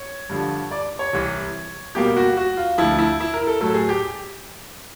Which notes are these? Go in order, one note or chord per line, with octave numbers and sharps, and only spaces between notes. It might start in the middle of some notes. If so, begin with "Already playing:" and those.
Already playing: C#5
G2 D3 F3
D5
C#5
C2 C3 E3
B2 G3 A#3 G4
F#4
F#4
F4
D2 D3 F3 E4
E4
E4
A#4
A4
A2 F#3 A3 A4
G#4
G4